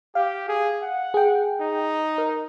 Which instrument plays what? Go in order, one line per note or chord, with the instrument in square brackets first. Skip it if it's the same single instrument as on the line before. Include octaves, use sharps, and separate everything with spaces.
[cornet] G4 [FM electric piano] F5
[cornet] G#4
F#5
[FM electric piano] G#4 G5
[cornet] D#4
[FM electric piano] A#4